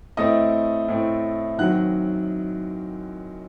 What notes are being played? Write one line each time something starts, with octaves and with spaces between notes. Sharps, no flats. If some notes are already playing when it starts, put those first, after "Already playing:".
A2 A3 C4 D#5 D#6
A2 A3 C4
F#2 D#3 F#3 C4 F#5 F#6